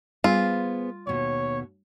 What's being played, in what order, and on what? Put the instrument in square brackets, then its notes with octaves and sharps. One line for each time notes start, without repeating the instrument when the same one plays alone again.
[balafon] G3 [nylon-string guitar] B3 G#4 C5 [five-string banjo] F4
[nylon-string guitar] D#2 B2 [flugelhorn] C#5